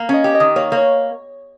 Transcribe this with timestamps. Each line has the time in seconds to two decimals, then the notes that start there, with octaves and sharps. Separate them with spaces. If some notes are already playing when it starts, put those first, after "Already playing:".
Already playing: A#3
0.09 C#4 D#5
0.24 G4
0.35 D#5
0.40 D#3
0.56 A#3 C#5
0.72 A#3
0.77 C#5